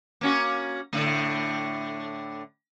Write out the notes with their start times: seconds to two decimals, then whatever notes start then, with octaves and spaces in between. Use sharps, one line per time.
0.21 A#3 C#4 F#4
0.93 A2 D3 A3